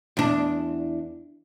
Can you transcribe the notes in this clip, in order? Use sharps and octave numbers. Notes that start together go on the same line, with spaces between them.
E2 D4